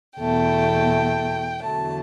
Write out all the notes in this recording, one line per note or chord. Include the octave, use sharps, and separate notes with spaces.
E2 B2 A3 G5
E2 D3 F#3 A3 A5